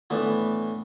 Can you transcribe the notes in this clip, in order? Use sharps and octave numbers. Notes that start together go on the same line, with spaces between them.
A2 E3 B3 D4